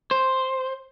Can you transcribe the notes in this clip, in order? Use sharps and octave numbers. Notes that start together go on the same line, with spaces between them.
C5